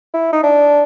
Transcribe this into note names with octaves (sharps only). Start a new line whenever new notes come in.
E4
D#4
D4